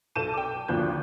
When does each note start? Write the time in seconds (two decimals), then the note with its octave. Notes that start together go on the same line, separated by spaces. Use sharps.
0.16 B1 A4 A5 G6 D#7 E7
0.34 G5 D6
0.68 G#1 D2 F3 A#3 F#6 G6